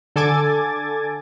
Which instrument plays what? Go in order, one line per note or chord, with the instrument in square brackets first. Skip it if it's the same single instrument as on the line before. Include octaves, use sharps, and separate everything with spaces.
[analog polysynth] D3 A4 G#5 D6 G#6 A6